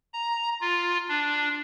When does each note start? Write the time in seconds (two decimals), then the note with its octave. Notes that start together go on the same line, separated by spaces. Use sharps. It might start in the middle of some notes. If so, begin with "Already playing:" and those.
0.13 A#5
0.61 F4
1.08 D4